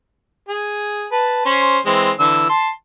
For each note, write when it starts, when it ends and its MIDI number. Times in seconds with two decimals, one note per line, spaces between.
0.49 1.06 68
1.12 1.42 71
1.12 1.42 81
1.45 1.79 61
1.45 1.79 72
1.86 2.11 52
1.86 2.11 56
1.86 2.11 60
2.19 2.47 50
2.19 2.47 52
2.19 2.47 88
2.49 2.69 81
2.49 2.69 84